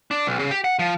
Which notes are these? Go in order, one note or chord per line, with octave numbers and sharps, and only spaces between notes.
D4
B1
C#3
G4
F#5
F3